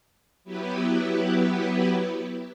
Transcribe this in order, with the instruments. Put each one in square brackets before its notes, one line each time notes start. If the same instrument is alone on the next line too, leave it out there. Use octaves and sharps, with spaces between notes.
[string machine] F#3 B3 E4 G4 B4